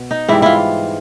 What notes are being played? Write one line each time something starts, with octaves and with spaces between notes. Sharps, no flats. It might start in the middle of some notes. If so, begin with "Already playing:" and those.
Already playing: B2
D#4
G#2 E3 G3 E4
E4 F4